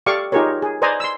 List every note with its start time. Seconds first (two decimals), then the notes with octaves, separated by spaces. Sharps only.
0.06 G4 A4 D5 F5 C#6 D6
0.32 D#4 F4 G4 G#4 A#4 C#5
0.62 G#4
0.82 B4 C5 D5 D#5 G#5 A#5
1.00 C6 E6